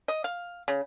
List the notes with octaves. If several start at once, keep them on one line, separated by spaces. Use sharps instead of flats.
D#5
F5
C#3